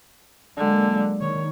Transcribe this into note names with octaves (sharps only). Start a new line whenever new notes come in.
D3 F#3 G#3 A#3
D#3 C#5